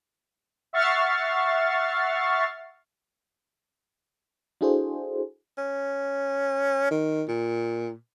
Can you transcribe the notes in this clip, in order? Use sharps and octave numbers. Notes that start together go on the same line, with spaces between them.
E5 F#5 C#6 F6 A6 C7
D4 E4 F#4 G#4 A4 C5
C#4
D#3
A#2